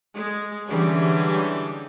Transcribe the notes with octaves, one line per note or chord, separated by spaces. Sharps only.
G#3
D3 E3 G3 G#3 C#4